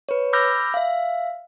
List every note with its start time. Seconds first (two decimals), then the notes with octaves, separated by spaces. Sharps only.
0.09 B4 C#5
0.33 B5 D6 E6 F6 G6 A#6
0.74 E5 F5